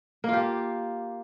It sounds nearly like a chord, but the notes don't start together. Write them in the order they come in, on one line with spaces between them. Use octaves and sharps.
A#3 F4 G4